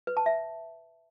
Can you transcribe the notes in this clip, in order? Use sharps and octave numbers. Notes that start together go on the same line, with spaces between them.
B4
A5
E5